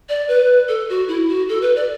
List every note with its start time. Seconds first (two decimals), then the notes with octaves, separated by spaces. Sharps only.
0.09 D5
0.28 B4
0.68 A4
0.89 F#4
1.08 E4
1.28 F#4
1.49 A4
1.62 B4
1.76 D5